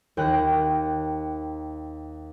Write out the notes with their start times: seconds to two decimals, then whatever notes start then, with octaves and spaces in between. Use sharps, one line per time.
0.17 D#2 G5 A#5 F#6